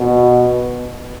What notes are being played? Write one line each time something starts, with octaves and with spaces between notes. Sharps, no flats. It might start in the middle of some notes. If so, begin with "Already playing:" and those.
Already playing: B2